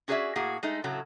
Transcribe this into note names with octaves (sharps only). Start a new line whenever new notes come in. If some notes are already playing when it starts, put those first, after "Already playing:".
C#4 F#4 G#4 C5 D5 E5
A2 A#3 F#4 G#4
G#3 A3 D#4
A2 C#3 F#3 A3